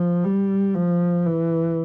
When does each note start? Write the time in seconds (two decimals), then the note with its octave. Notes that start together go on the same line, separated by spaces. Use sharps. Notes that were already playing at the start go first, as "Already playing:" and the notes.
Already playing: F3
0.24 G3
0.75 F3
1.26 E3